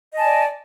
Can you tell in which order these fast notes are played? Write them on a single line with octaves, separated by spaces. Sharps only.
D#5 A5 G#5 D5